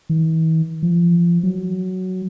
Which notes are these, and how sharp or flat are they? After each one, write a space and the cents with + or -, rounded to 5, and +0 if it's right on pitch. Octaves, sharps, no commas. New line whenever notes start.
E3 -45
F3 -25
F#3 +5